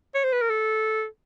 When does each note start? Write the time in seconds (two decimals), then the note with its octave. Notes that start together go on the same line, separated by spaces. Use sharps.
0.15 C#5
0.24 C5
0.32 B4
0.42 A#4
0.50 A4